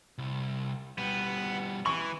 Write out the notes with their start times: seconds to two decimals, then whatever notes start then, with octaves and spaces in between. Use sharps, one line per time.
0.18 C2
0.98 B2 G3 B3
1.86 E3 C#6